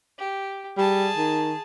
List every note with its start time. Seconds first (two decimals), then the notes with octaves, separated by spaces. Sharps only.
0.18 G4
0.77 G3 G#4 A5
1.17 D#3